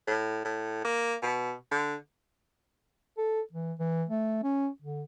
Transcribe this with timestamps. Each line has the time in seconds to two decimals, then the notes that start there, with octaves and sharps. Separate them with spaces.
0.07 A2
0.45 A2
0.84 A#3
1.22 B2
1.71 D3
3.18 A4
3.53 E3
3.79 E3
4.09 A3
4.43 C#4
4.82 D3